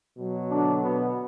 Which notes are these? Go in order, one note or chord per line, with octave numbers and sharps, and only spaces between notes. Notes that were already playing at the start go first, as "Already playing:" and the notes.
B2 F#3
D3 D4
B2 B3